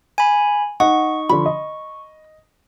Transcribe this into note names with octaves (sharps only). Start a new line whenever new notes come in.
G#5 B5
D#4 F#5 C#6
D3 F3 B5
D#5